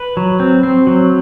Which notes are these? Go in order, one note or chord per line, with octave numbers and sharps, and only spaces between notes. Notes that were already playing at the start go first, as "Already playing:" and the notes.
Already playing: B4
F#3
C4
C4
F#3